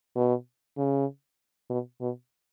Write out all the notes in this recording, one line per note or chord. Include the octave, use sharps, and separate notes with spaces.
B2
C#3
B2
B2